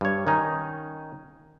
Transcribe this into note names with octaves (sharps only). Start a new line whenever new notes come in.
G2 C#5
D#3 C#4 D#4